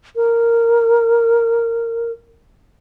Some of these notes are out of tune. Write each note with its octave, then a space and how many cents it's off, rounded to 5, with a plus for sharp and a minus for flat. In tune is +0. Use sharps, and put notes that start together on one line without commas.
A#4 -10